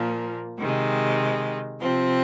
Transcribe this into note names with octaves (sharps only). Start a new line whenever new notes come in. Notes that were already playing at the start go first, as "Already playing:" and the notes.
Already playing: A#2 F3 A#3
C3 D#3 G#3
C3 F3 C4